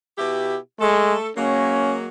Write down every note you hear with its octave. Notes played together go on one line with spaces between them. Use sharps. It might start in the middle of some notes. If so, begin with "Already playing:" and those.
B2 E4 G4
G#3 A3 A4
F#3 G#3 A#3 C#4